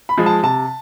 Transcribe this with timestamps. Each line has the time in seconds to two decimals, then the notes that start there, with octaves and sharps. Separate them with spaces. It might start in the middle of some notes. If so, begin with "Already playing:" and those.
0.09 B5
0.17 F3 G#3
0.26 A5
0.43 C3 A5